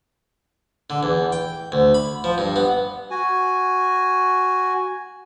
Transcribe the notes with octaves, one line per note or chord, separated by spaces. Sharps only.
D3
E2
G5
D2
B5
F3
G2
B3
F#4 G#5